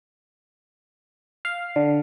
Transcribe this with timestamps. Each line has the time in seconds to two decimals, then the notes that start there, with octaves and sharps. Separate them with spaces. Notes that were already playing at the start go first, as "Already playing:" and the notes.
1.45 F5
1.76 D3